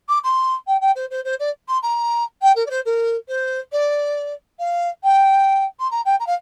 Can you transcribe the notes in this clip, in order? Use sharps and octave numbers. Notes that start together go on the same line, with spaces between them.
D6
C6
G5
G5
C5
C5
C5
D5
C6
A#5
G5
A#4
D5
C5
A#4
C5
D5
F5
G5
C6
A#5
G5
A#5
F5